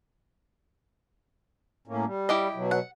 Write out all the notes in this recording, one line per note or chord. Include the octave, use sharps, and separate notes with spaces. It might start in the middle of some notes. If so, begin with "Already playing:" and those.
A2 A#3 C#4
G3
E4 G4 D#5
B2 F#3
F#5